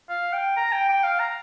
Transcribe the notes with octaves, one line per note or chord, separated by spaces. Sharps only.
F5
G5
A#5
G5
G5
F5
A#5